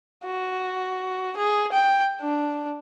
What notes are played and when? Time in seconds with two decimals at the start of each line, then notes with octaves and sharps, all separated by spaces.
0.25 F#4
1.37 G#4
1.72 G5
2.21 D4